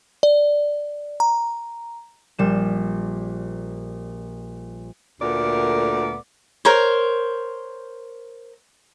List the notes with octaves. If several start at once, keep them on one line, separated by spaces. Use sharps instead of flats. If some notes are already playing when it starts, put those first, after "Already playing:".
D5
A#5
A#1 G3 E7
D2 A#2 A3 B3 A#4 D5
A#4 C5 C#5